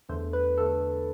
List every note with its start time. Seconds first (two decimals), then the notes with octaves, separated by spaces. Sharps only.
0.09 E2 D3 A3 C5
0.33 B4
0.58 D3 A3 A4